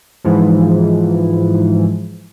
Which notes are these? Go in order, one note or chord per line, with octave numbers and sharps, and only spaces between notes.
G#2 E3 F3